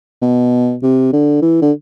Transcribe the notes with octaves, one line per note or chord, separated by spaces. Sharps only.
B2
C3
D3
E3
D3